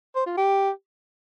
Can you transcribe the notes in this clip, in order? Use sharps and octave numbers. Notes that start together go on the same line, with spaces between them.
C5
F4
G4